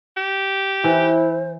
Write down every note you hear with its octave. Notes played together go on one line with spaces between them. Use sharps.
G4
E3 E4 C5